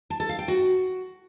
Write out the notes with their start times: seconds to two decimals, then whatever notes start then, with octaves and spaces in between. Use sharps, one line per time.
0.10 A5
0.20 A4
0.29 F5
0.39 G5
0.48 F#4